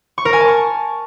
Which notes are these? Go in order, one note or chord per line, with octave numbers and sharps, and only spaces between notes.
C#6
A#4
G#5
A5
C#6